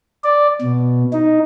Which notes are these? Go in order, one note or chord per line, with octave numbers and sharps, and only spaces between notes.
D5
B2
D#4